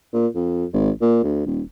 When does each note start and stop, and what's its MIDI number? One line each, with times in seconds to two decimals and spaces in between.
0.13 0.27 46
0.35 0.65 41
0.73 0.90 32
1.02 1.20 46
1.23 1.42 38
1.46 1.61 27